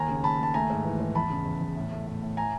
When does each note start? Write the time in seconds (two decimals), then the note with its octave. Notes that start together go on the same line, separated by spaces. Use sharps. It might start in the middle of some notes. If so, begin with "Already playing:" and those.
Already playing: D#2 G#5 A#5
0.08 C#3
0.24 D#2 A5 B5
0.39 D#2 A5
0.54 A3 G#5 A#5
0.70 G#2
0.85 E3
1.00 G#2
1.15 E2 A5 B5
1.30 C#3
1.46 E2
1.61 E2
1.76 A2
1.91 A3
2.07 A2
2.22 A2
2.37 G#5 A#5